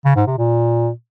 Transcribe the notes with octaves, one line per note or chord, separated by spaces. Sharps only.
C#3
G#2
C3
A#2